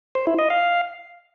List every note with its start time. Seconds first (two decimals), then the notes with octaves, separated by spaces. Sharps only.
0.15 C5
0.27 E4
0.39 D#5
0.50 F5